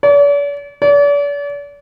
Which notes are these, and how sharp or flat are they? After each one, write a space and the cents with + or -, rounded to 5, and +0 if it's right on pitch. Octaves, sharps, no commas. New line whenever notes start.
D5 -45
D5 -40